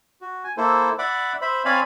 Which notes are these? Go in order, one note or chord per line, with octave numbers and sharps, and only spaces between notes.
F#4
G#5
A#3 E4 A4 C5
D5 E5 F#5 B5 D6
C5 E5 B5
C4 C#5 D5 F5 G#5 B5